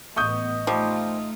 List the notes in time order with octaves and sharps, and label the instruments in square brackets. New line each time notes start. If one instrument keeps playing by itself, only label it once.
[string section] A1 B3 [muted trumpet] D#5 [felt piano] C#6 D#6 G6
[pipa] F3 G3 [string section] A3 D#4 F4